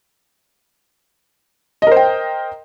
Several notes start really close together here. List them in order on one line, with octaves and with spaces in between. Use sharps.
D#5 A#4 C5 G5